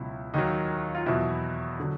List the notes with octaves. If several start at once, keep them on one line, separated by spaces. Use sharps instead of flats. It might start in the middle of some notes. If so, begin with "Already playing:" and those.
Already playing: C#2 B2 F#3 E4
D#2 D#3 F#3 D#4
F4
E2 B2 F#3 E4
D3 F#3